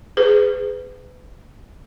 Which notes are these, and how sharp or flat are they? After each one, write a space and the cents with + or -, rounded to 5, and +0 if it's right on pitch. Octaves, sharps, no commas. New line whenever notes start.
G#4 +0 B4 +30